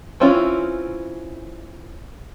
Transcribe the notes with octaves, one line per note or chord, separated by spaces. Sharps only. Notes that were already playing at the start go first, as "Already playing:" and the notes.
E3 C4 C#4 E4 F4